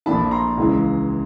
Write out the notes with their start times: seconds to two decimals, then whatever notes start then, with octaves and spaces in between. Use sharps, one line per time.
0.06 A#1 A#2 F3 A3 D4 A5 B5
0.31 A#5 C6
0.57 C#2 C#3 E3 G#3